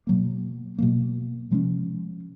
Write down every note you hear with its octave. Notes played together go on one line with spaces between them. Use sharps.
B2 F#3 A#3
B2 F#3 A#3
C3 F3 G#3 C#4